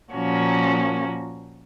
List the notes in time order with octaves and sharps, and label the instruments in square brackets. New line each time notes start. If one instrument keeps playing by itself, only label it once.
[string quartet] A#2 F3 A#3 C#4 F#4